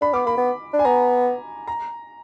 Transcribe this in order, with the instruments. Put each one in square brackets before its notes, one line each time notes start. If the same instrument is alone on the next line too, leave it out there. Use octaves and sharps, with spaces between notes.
[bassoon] D4 [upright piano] B5
[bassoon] B3 [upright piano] D6
[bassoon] A#3 [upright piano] B5
[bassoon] B3
D4
[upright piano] G#5
[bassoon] B3 [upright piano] A#5
[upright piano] A#5